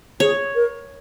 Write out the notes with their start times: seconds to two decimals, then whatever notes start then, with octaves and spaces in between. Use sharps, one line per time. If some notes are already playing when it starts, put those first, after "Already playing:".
0.20 G#4 C#5
0.55 A#4